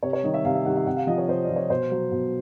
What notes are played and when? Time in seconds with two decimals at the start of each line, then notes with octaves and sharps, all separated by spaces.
0.03 C3 C#5
0.13 C#5
0.23 D#3 G3 D#5
0.34 E5
0.45 C3 F5
0.55 E5
0.66 D#3 G3 F#5
0.77 E5
0.86 C3 F#5
0.97 F5
1.07 F3 D#5
1.18 C#5
1.28 C3 C5
1.44 D5
1.49 F3
1.56 C#5
1.70 B2 C5
1.91 F#3
2.12 B2